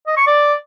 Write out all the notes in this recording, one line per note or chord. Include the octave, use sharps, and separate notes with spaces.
D#5
C#6
D5